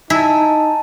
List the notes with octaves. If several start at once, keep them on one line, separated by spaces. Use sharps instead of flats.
D#4 E4 G#5 A5